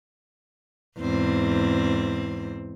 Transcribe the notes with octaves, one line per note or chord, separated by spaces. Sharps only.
E2 G#2 C4